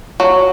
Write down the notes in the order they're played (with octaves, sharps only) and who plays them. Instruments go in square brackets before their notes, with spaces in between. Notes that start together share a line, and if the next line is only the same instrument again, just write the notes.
[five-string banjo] F#3